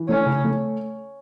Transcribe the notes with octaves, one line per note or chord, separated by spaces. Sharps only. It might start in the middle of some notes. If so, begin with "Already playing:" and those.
Already playing: E3
A3 C#4
C#3
A3